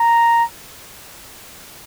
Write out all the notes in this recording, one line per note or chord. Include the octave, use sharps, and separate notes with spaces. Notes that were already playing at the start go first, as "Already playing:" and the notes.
Already playing: A#5